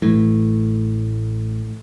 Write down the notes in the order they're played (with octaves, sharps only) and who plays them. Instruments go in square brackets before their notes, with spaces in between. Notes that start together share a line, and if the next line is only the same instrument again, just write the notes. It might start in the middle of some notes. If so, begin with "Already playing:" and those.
[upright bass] A1 [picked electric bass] A2